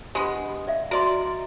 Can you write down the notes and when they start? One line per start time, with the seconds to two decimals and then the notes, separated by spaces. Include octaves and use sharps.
0.15 G#3 B3 D4 G4
0.67 D5 E5 F5
0.91 F#4 A#4 D5 D#5 C6